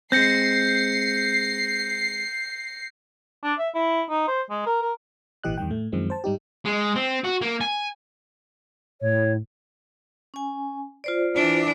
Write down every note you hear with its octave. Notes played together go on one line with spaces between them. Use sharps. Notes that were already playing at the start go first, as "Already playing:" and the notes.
G#3 C4 G6 A#6 C7 C#7
D4
E5
E4
D#4
C5
G#3
A#4
A#4
G#1 A#2 E3 G4 D#5 F#6
E2 D#3 G3 G5
A2 A3
F#2 D#3 F3 G#3 C4
C5 A5
G#2 G3 D#4 G4
G#3
C4
F#4
A#3
G#5
A2 C#5
C#4 G#5
F4 C5 D5
E3 D4